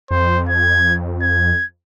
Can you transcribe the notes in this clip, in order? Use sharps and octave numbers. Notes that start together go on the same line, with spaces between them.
F2 C5
G#6
G#6